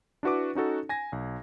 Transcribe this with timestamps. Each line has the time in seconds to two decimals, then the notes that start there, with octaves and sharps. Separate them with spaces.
0.23 D4 E4 F#4 B4 D6
0.55 C#4 D#4 F#4 A4
0.89 G#5 G#6 A#6
1.12 B1